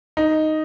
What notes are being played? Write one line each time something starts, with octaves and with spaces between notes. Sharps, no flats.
D#4